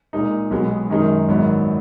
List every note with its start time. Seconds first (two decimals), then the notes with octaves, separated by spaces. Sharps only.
0.13 A#2 G#3 D#4
0.51 B1 B2 G#3 B3
0.89 F#2 D#3 G#3 D#4
1.28 A#1 G#2 D#3 F#3 B3